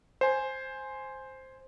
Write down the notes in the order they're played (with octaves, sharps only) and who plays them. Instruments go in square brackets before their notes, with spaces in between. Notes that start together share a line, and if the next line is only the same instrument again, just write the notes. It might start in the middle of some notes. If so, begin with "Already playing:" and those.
[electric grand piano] C5 G#5